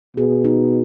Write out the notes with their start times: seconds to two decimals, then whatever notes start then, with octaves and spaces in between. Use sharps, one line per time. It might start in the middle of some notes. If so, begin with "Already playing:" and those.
0.17 B2 G#4
0.45 D#4